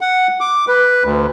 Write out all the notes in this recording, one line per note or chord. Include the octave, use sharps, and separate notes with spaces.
F#5
D6
B4
D2